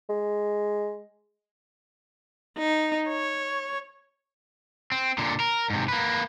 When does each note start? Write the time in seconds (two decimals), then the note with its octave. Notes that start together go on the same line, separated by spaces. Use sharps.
0.09 G#3
2.58 D#4
3.08 C#5
4.92 C4
5.18 A#2 D3
5.40 A#4
5.70 G#2 C3
5.89 A#3 B4